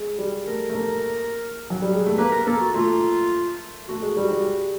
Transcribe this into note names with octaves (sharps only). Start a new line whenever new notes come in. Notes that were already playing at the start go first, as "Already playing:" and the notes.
Already playing: G#3
G3
A3 A#4
A3
A#3
F#3
G3
G#3
A3
A#3 B4
A#4
A#3 A4
F#4
A3 F4
A3 F#4
G#3
G3
G3